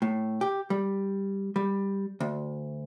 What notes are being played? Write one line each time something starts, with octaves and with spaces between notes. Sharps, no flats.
A2
G4
G3
G3
D2